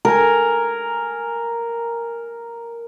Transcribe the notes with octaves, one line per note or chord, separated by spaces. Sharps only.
A#4 G#5